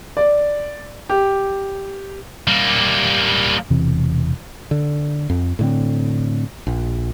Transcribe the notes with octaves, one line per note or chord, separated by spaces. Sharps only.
D5
G4
G3 A#3
E1 C3 E3 C4
D3
F2
A2 D3 C4
A#1